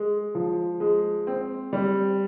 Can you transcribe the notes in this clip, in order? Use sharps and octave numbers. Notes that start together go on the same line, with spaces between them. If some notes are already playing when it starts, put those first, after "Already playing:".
Already playing: G#3
F3
G#3
C4
G3